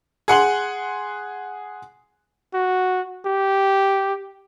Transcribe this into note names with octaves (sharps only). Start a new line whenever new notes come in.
G#4 F#5 C6 F#7
F#4
G4